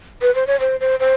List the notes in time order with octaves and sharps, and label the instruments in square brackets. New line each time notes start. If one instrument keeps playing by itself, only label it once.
[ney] B4
C5
C#5
C5
C5
C5